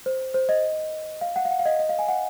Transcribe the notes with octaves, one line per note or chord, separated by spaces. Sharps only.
C5
C5
D#5
F5
F#5
F5
F#5
F5
D#5
D#5
F5
G#5
F#5